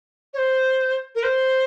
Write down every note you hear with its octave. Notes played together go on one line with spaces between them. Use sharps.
C#5
C5
A#4
C5